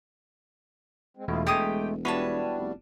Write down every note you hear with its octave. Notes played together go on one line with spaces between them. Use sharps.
G#3 C4
E1 E2 B2 A3 E4 F4
G#3 A3 G4 G5 D#6
G3 B3 D4 E4 F#4 B4 C#5 A5
F1